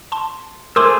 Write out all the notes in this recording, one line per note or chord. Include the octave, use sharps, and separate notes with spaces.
A5 C6
A3 G#4 A#4 C5 C6 D6 E6